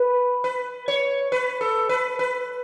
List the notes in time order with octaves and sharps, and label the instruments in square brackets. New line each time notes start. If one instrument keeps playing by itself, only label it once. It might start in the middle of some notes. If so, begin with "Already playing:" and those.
Already playing: [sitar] B4
B4
C#5
B4
A4
B4
B4